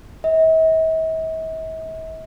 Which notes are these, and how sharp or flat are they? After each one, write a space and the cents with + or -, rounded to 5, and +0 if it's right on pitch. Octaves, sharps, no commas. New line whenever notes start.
E5 -45